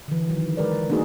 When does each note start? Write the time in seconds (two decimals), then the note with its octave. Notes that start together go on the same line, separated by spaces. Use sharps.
0.08 D3 E3
0.29 D#3 F#3
0.57 G#3 A#4 B4 D5
0.89 A3 A#3 D4 D#4 F#4 G#4